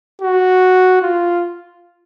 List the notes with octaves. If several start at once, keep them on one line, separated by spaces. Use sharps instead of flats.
F#4
F4